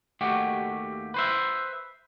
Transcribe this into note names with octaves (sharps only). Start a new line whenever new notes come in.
D#2 A3 F#4 G4
B4 C5 E5